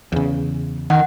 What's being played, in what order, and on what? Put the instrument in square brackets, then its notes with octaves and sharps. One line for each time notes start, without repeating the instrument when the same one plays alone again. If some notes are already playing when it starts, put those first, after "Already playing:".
[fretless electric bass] E2 C#3
[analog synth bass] D#3 [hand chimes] F#5